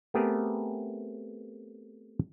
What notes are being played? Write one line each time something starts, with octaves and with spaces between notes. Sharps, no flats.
A3 B3 C4 G4 G#4 A#4